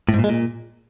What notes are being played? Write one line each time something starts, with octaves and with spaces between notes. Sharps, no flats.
A2
G#2
A#2
G#3
A#2